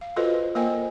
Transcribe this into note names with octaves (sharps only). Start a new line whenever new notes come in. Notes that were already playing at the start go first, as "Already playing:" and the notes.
F5
F4 F#4 A4 B4 C5 D#5
A#3 A#4 C5 D#5 G5 G#5